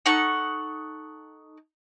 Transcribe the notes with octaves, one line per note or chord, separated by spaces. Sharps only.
D#4 A4 F#5 C#6